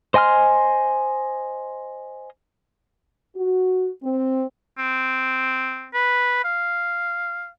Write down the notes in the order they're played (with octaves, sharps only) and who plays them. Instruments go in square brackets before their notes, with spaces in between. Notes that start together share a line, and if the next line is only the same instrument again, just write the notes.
[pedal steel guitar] C5 D#5 G#5 C6 F6
[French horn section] F#4
C4
[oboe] C4
B4
F5